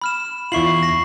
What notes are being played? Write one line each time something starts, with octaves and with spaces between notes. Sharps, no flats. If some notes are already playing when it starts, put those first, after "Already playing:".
B5 F6 E7
E2 E4 F4 C#6 C7 F#7
A#6 C7